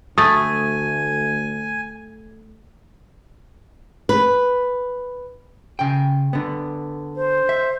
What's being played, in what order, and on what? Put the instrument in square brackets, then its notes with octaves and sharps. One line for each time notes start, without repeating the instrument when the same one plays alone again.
[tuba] D2 [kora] A3 [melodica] G#5 [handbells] D#6 A6
[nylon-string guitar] B4
[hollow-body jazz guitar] C#3 G5
D3 B3
[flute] C5
[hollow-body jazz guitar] E5